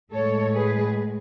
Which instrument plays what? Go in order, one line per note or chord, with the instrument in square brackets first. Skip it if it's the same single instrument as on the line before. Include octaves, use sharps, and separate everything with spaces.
[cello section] A2 G#3 A4 C#5
G#4 B4